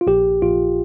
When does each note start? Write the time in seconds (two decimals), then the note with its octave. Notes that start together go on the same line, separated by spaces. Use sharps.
0.01 F4
0.07 A#1 G4
0.42 A#1 F4